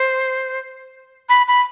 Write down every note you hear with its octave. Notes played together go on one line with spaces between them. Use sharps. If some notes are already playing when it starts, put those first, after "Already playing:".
Already playing: C5
B5
B5